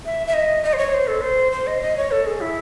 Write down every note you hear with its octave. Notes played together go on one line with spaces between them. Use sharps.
E5
E5
D#5
D#5
C5
C#5
C5
A4
C5
C5
D#5
D#5
C#5
A4
G#4
E4